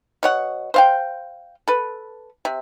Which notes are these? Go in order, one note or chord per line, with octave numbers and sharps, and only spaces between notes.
B2 C#5 F#5
C5 F5 G5
A4 B4
C3